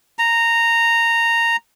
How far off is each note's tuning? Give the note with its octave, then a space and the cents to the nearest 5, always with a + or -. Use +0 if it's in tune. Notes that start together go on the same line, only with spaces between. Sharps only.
A#5 -10